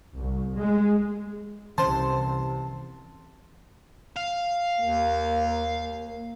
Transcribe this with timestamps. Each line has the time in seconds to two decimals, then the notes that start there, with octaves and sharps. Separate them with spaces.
0.17 C2
0.56 G#3
1.78 C2 C3 E3 C#4 C5 A5
4.17 F5
4.80 D#2 A#3